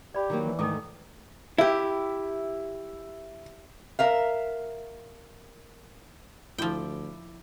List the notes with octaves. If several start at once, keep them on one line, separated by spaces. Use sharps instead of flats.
G4 D5 B5
D#3 F#3 A#3
E3
G#2 D#3 A3 D#4 A4 D6
E4 G4 E5
A#4 E5 F5
D2 F3 E4 G5 D6 D7